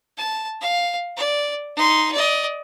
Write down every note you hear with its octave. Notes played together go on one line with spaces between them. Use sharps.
A5
F5
D5
D#4 C6
D5 D#5